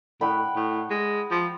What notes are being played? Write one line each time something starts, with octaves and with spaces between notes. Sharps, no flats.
A2 F#5 G5 B5
A2
G#3
F3